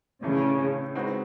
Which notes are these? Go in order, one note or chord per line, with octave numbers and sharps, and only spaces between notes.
A2 C#3 E3 A3 D4
G#3 C4 D#4 F#4 B4